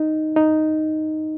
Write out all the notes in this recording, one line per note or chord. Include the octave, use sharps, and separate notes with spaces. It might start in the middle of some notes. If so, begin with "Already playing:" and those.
Already playing: D#4
D#4